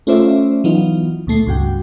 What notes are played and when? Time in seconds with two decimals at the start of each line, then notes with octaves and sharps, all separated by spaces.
0.07 A3 C#4 F4 C5 D5 E5
0.64 E3 F#3 B3 D#4 F4
1.27 D2 A#2 A3 C7
1.47 C#2 G2 F#4 G5